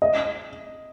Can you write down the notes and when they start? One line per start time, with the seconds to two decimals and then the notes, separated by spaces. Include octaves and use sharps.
0.02 D#5